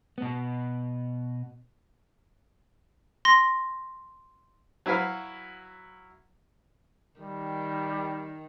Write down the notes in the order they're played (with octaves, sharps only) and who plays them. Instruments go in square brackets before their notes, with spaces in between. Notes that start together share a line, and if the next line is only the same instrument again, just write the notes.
[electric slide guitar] B2 B3
[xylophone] C6 A#6
[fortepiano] F#3 E4 F#4 B4 F5
[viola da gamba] D#3 [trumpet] G3